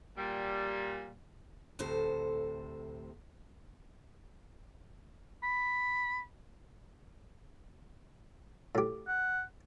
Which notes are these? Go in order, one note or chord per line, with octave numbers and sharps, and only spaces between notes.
A#2 G3
D2 A2 C3 A4 C5
B5
A2 G4
F#5